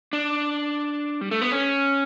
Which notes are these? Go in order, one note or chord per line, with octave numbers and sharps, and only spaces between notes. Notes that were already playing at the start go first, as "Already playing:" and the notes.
D4
G3
A3
B3
C#4